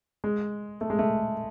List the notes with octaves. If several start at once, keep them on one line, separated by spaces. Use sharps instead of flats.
G#3
A3
G#3
A3